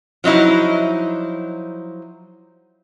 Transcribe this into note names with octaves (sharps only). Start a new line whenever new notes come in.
F3 F#3 D#4 E4